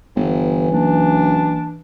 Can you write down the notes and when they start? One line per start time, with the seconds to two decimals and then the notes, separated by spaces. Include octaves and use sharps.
0.16 G1 E3
0.72 F#1 D4